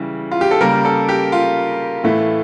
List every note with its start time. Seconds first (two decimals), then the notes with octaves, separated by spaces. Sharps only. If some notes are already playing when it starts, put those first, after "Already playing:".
Already playing: C#3 E3 G3
0.32 F4
0.41 G4
0.51 A4
0.61 C#3 G3 A#3 A#4
0.85 A4
1.09 G4
1.32 F4
2.04 A2 E3 A3